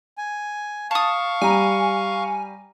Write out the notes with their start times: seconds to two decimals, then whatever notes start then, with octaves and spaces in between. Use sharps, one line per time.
0.18 G#5
0.91 F5 A5 C#6 D#6
1.42 G3 G#5 A#5